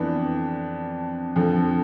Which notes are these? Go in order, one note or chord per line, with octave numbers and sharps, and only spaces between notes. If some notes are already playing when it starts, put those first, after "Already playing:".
Already playing: F2 E3 B3 D4
F2 D3 F3